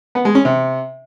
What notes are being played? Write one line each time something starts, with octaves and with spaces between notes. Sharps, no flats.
B3
G#3
C#4
C3